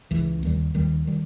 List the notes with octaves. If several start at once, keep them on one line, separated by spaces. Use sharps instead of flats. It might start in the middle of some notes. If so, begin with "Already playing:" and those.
C#2 C#3 E3
D#2 D#3 G3
D#2 D#3 G3
D#3 G3